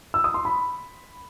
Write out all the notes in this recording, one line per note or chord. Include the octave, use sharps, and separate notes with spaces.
E6
D#6
C6
B5